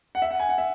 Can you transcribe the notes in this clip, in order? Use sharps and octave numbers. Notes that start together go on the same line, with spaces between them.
F#5
E5
F#5
G#5
F#5
E5